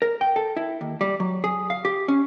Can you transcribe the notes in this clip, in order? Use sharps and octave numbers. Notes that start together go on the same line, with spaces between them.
A#4
G5
A4
E4
D#2
G3
F#3
G#4
F5
G4
C#4